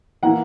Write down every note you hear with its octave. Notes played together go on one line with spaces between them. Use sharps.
E3 A#3 E4 F#5 A#5